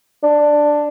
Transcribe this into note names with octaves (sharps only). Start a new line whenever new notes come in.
D4